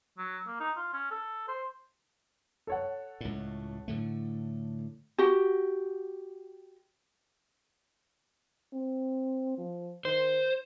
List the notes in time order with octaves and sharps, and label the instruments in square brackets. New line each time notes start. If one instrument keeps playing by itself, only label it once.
[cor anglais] F#3
A#3
D#4
F4
C#4
A4
C5
[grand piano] A4 C#5 F#5
[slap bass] C#2 A2
A2 D3 A3
[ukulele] F#4 G4
[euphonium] C4
F3
[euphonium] D#3 [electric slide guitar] C5